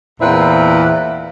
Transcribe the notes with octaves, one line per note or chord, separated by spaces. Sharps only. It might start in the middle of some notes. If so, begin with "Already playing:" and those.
E2 A#2 C4 E4 B4